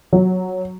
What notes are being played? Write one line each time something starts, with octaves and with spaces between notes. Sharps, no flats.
F#3